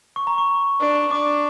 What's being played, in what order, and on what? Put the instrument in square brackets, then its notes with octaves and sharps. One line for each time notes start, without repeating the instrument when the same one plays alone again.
[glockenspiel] C#6
A#5
C#6
[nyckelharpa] D4
[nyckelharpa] D4 [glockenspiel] D6